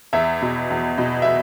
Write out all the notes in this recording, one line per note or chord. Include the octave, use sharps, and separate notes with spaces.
E2 E5
B2
E2
B2
E5